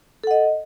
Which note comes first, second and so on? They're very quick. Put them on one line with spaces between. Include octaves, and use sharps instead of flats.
A4 F#5 D#5